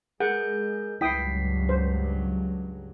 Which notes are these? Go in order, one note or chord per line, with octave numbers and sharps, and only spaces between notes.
G#3 G#4 A#4 F#5 G6
C#2 G2 F#3 E4 G5 D#6 B6 C7
C5